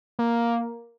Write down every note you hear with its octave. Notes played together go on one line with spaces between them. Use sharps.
A#3